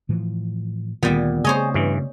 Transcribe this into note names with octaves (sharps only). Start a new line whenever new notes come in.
A2 E3 F3
D2 A#2 D#3 G3 B3
C#3 A3 C4 G#4 C5 C#5 D#5
G2 E3